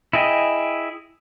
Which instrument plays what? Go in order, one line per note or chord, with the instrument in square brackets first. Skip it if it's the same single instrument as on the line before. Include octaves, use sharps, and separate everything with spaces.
[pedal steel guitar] E4 G#4 D#5 G5